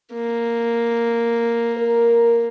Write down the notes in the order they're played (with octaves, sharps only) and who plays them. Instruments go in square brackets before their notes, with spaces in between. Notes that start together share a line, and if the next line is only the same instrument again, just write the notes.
[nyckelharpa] A#3
[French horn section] A#4